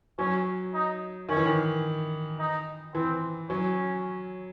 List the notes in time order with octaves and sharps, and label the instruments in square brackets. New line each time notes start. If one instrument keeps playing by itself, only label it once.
[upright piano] F#3 [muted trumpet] C#4
[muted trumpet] D#4
[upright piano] D#3 [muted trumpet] C#4
[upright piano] E3
D#3
[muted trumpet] D#4
[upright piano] E3 [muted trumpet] C4
[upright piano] F#3 [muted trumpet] C#4